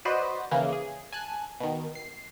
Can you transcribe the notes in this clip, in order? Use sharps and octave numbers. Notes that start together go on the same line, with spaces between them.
F#4 B4 C5 D5 D#5
D#2 C#3 E3 A#3
G#4
G#5 A5 F#6
B2 D#3
C7